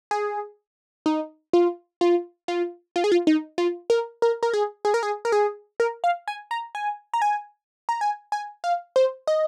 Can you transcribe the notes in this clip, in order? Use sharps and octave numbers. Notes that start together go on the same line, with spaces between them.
G#4
D#4
F4
F4
F4
F4
G#4
F4
D#4
F4
A#4
A#4
A#4
G#4
G#4
A#4
G#4
A#4
G#4
A#4
F5
G#5
A#5
G#5
A#5
G#5
A#5
G#5
G#5
F5
C5
D#5